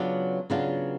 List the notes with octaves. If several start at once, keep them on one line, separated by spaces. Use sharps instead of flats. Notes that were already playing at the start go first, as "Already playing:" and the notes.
Already playing: C#3 F#3 B3 D4 F4
C#3 F#3 B3 D4 F4